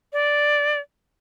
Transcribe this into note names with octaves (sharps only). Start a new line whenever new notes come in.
D5